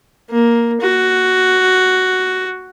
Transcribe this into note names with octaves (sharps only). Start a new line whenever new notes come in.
A#3
F#4